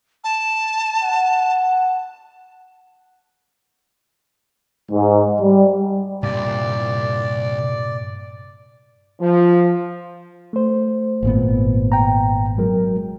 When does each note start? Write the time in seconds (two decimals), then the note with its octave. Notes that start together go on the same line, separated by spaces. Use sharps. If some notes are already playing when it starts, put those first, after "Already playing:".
0.24 A5
1.03 F#5
4.92 G#2
5.40 G3
6.23 C2 G2 A#2 D5
9.20 F3
10.53 A3 C5
11.23 G#1 A#2 B3
11.92 G5 A#5
12.58 F#3 G#3 A#4